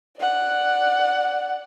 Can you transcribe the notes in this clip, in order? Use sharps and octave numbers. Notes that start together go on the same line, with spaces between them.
D5 F#5